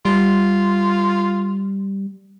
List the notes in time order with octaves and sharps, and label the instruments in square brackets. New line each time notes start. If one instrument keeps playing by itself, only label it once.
[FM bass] G3 [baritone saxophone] F4